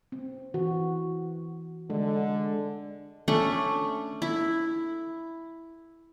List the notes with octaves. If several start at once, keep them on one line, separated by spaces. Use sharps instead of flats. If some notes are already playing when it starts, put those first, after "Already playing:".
C4
E3 F#4
D3 G#3
A3 C#4 D4 C#6
E4